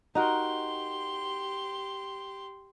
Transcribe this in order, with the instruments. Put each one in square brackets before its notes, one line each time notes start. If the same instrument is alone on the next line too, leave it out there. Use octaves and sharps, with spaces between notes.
[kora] D#4 F#4 A#4 [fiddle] G4 C6